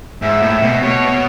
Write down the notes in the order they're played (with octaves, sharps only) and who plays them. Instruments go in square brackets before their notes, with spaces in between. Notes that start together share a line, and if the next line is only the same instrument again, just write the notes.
[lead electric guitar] G#2 [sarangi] E5
[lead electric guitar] A2
B2
[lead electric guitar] B2 [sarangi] C#5